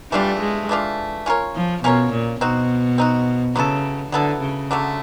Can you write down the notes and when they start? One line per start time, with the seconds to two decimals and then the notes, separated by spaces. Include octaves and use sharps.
0.11 E3 G3 A3 D4 F4
0.40 G#3
0.69 E3 A3 D4 F4
1.26 C#4 F4 A#4 C#5
1.55 F3
1.83 B2 C#4 F4 A#4 C#5
2.13 A#2
2.41 B2 C4 D#4 F#4
2.98 C4 D#4 F#4
3.55 C#3 F#3 B3 E4 A4
4.12 D3 F#3 B3 E4 A4
4.41 C#3
4.71 D3 F#3 A3